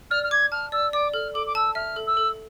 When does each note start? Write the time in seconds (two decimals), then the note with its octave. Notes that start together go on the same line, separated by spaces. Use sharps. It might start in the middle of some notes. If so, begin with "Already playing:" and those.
0.11 D5 F6
0.24 F6
0.31 D6 G#6
0.52 A5 F6
0.72 D5 E6
0.93 D5 D6
1.14 A4 F6
1.34 A4 D6
1.47 D6
1.55 A5 E6
1.75 E5 F6
1.96 A4
2.07 E6
2.17 A4